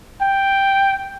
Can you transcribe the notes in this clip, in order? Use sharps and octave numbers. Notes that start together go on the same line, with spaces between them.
G5